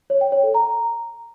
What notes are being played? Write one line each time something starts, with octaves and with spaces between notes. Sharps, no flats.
C#5
G5
C#5
A4
A#5